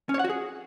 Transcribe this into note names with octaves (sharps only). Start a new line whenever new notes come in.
C#4
C#5
F#5
F#4
G#4